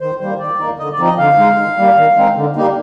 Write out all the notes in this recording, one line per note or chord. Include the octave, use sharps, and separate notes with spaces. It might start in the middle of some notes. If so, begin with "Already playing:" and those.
D#3 C5
G3 A#3 C5
D#3 D5
A#3 D#4
D3 D#5
D5
F3 C4 D#4
D#5
D3 F5
G#3 D#4
D#3
G3 A#3
D#3
G#3 C4 D#4
D3
G3 A#3 D#4